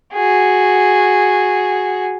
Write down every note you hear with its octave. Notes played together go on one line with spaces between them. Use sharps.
F#4 G#4